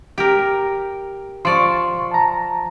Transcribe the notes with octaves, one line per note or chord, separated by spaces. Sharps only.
G4 A#4
F3 D5 C6 C#6
A5 A#5